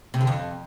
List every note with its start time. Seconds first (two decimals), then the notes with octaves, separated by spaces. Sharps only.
0.14 C3
0.21 D3
0.27 F2